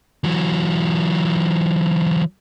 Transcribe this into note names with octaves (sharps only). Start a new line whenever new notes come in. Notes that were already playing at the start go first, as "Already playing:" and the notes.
E3 F#3